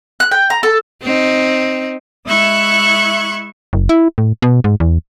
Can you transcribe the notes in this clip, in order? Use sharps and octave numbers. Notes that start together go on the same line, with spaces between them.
F#6
G5
A#5
A4
C4 D#4
G#3 E4 E5 C#6 F#6 G#6
F#1
E4
A2
B2
G#2
E2